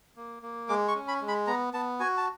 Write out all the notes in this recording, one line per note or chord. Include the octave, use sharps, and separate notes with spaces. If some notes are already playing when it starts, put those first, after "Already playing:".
A#3
A#3
G#3 D6
C#6
C#4
B5
G#3
B5
B3 A#5
B3 A5
F#4 G#5
A5